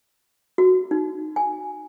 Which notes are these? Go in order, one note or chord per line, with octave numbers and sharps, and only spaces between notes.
F#4
D#4
G#5